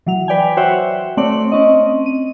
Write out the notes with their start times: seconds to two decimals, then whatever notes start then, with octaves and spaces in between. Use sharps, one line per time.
0.06 E3 F#3 F7
0.28 B4 D5 G5 G#5
0.57 F#4 C5 C#5 E5 F#5 G5
1.17 A3 C4 C#5 D5 F#7
1.52 C4 C#4 D#5
2.06 D#7